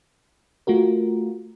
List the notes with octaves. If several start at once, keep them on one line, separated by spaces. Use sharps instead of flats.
A3 F4 F#4 A#4